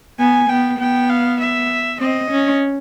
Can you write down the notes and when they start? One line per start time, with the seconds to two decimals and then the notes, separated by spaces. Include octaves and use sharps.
0.19 B3 G#5
0.49 B3 G5
0.79 B3 G5
1.10 F5
1.40 E5
2.00 C4 D#5
2.31 C#4